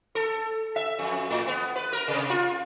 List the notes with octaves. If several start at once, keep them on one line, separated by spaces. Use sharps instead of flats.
A4
E5
F2
A2
B3
B4
A#4
C3
F4